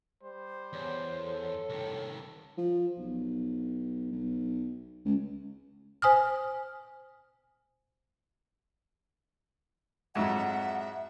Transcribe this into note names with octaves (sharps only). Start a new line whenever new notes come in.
G3 C5
E2 C#5
A4
C2 D#3
F3
B1
B1
C#2
C5 G#5 D#6 F6
F2 G#2 F#3 E5 F#5